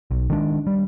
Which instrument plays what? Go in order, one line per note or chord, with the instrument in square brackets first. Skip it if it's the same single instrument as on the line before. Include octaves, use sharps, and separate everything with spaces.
[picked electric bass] B1
D#3 G#3 D4
G3